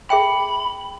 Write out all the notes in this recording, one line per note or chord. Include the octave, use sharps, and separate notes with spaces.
G#4 E5 G5 B5